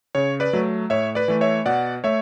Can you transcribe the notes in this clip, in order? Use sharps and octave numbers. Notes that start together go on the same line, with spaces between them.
C#3 C#5
B4 D5
F#3 A3
A2 C#5 E5
B4 D5
E3 A3
C#5 E5
B2 D5 F#5
A3 C#5 E5